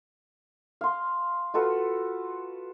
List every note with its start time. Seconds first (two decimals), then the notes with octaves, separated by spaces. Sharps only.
0.81 F5 C6
1.54 F4 F#4 A4 B4